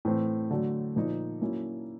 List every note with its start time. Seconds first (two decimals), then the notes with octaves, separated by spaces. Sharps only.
0.05 A2 E3 A3 C4
0.51 D3 F#3 A3
0.96 A#2 F3 A#3 D#4
1.41 F#3 A#3 C#4 E4